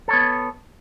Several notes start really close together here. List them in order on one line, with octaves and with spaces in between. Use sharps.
A4 C#5 B3